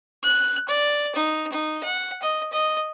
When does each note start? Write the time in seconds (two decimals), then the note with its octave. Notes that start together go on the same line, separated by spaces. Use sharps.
0.24 F#6
0.69 D5
1.15 D#4
1.52 D#4
1.84 F#5
2.22 D#5
2.53 D#5